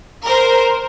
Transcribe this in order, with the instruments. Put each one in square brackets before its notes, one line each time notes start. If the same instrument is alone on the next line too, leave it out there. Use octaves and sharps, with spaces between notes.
[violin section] A#4 C5